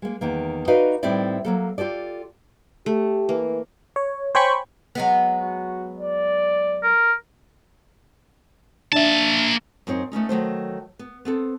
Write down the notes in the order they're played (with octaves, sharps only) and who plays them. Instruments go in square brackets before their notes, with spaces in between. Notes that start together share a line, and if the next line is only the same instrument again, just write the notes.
[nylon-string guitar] G#3 A#3
E2 D#3 A#3
D#4 F#4 B4 D5 D#5 F5
A2 G3 C4 D#4 E4 D5
F#3 A#3 A4
F4 G4 A4 D5
[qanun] A3 [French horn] G4
[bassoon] E3 [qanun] A#3
[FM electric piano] C#5
C5 C#5 G5 G#5 B5 C#6
[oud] F#3 G#3 B3
[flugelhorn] F#4
D5
[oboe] A#4
[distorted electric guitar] A#3 A5 [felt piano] D4 E5
[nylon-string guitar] F#2 C4 D#4 C#5
A3 B3 C#4 D#4
D#3 F#3 A3 C5
B3
B3 C4 A4